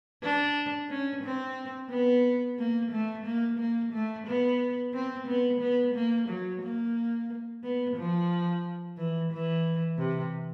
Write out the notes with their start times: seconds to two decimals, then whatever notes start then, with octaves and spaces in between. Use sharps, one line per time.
0.22 D4
0.89 C#4
1.23 C4
1.90 B3
2.58 A#3
2.92 A3
3.25 A#3
3.58 A#3
3.93 A3
4.27 B3
4.93 C4
5.27 B3
5.61 B3
5.94 A#3
6.29 F#3
6.62 A#3
7.63 B3
7.97 F3
8.97 E3
9.31 E3
9.98 C3